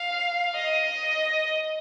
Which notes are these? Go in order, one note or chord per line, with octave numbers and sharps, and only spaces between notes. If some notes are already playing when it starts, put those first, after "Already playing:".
Already playing: F5
D#5